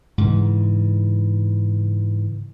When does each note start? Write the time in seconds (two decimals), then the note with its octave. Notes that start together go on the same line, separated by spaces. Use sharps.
0.18 G#2 C#3 E3